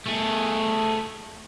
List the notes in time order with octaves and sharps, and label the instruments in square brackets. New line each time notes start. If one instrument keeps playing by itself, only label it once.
[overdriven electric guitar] A3 G#4